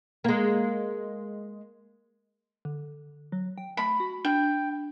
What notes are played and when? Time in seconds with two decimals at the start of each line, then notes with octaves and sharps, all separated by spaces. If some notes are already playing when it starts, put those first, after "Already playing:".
0.24 G#3 A#3
2.65 D3
3.32 F#3
3.58 G5
3.77 A3 B5
4.00 F#4
4.25 D4 G5